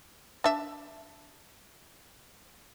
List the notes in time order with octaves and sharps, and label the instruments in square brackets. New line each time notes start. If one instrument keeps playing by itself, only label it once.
[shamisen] D4 E5